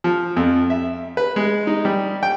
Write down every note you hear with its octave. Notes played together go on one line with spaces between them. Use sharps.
F3
F2
E5
B4
G#3
D#4
G3
G5